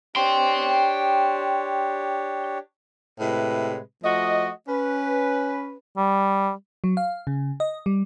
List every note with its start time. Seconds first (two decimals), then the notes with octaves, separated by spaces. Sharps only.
0.16 D4 G4 C#5 G5 C6
3.20 A2 C3 G#3 B4
4.03 F3 A3 F#4 D#5
4.68 C#4 B4
5.97 G3
6.84 F#3
6.97 F5
7.27 C#3
7.60 D#5
7.86 G3